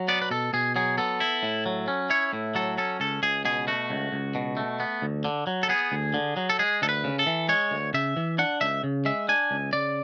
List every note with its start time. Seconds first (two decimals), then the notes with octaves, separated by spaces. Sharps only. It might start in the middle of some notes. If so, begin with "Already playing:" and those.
Already playing: F#3
0.08 B3 D5
0.22 B4
0.31 B2 A4
0.53 B2 G#4
0.76 F#3 G#4
0.98 B3 A4
1.20 E4
1.43 A2
1.66 F#3
1.88 C#4
2.10 E4 C#5
2.33 A2
2.55 F#3 A4
2.77 C#4 A4
3.00 C#2 A4
3.23 C#2 G#4
3.45 B2 G#4
3.67 A3 F#4
3.90 C#2
4.12 C#2
4.35 B2
4.57 A3
4.80 B3
5.02 D2
5.25 D3
5.47 F#3
5.63 A4
5.69 B3 G#4
5.92 D2
6.14 D3
6.37 F#3
6.50 A4
6.59 G#3 G#4
6.82 D2 A4
6.89 B4
7.04 C#3
7.19 A4
7.26 E3
7.49 G#3 C#5
7.71 D2
7.94 C#3 E5
8.17 E3
8.39 D4 F#5
8.61 C#2 E5
8.83 C#3
9.05 G#3 E5
9.29 D4 G#5
9.51 C#2
9.73 C#3 D5